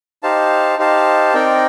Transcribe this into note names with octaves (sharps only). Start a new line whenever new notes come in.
D#4 G4 C5 F5 A5
D#4 G4 C5 F5 A5
C4 D#4 A#4 D5 G5